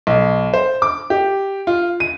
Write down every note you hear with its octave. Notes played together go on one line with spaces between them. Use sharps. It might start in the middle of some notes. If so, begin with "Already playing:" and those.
B1
C5
D6
G4
F4
D#7